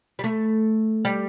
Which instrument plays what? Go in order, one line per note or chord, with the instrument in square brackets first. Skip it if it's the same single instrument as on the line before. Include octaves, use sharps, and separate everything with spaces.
[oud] G3
A3
G3